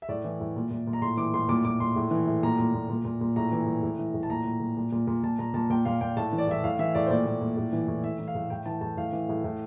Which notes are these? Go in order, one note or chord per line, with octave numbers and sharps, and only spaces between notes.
E5
A2 D5
E3
A2
A#2
A#2
A#2
A#5
A2 C6
E3 D6
A2 C6
A#2 D6
A#2 D6
A#2 C6
A2
E3
A2
A#2 A#5
A#2
A#2
A#2
A#2
A#2
A2 A#5
E3
A2
A2
E3
A2
A5
A#2 A#5
A#2
A#2
A#2
A#2
A#2
A#2 A5
A#2 A#5
A#2 A5
A#2 G5
A#2 F5
A#2 G5
A2 A5
E3
D5
A2 E5
A2 F5
E3 E5
A2 D5
C5
A#2 D5
A#2
A#2
A2
E3
A2
A2 E5
E3
F5
A2
A2 G5
E3 A5
A2 A5
A2 F5
E3
A2
A2